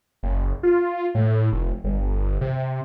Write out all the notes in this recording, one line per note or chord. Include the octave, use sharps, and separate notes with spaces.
F#1
F4
A2
F1
G1
C3